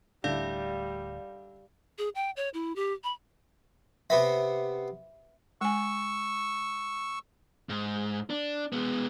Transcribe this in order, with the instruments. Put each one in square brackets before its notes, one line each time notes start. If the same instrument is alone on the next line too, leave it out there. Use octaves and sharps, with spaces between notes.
[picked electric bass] D1 D2 A2 [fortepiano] D3 E4 [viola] G3 [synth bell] D5 F5
[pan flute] G#4
G5
C#5
E4
G4
B5
[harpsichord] C3 B3 B5 [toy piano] E5
[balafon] G#3 G#5 [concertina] C#6 E6
[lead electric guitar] G#2
D4
G#3 B3